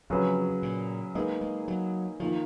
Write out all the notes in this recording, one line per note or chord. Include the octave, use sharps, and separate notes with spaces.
F2 C#3 F#3 C#4 G#4 B4
A#2
G#3 A#3 D#4 G#4 B4
G#3
F#3
D#3 F3 A#3 F4